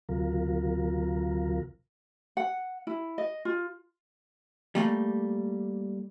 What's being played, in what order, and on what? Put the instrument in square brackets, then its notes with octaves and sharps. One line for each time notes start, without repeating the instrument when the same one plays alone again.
[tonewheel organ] D2 C3 F#3 F4 A#4
[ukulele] F#5
E4
D#5
F4
[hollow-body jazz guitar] G3 A3 A#3